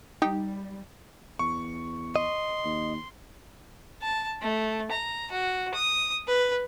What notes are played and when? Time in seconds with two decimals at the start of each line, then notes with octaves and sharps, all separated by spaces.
0.22 G3 D#4 G4
1.39 E2 C#6
2.16 D#5 C6
2.65 D#2
4.02 A5
4.42 A3
4.91 A#5
5.31 F#4
5.75 D#6
6.28 B4